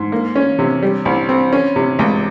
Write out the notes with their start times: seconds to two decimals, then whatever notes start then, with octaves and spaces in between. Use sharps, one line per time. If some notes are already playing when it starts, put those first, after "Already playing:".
Already playing: G#2
0.12 A#3
0.36 C#4
0.59 C3
0.82 G3
1.05 C2
1.29 C4
1.53 C#4
1.76 C3
1.99 C#2